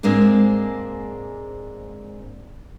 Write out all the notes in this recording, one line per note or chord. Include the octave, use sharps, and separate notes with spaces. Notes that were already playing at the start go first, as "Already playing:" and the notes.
G#2 G#3 A#3 C4 D4